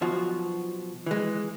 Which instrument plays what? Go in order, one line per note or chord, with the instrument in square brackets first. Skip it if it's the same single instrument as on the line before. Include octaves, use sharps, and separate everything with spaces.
[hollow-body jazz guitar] B1 B2 F3 F#4
E3 G#3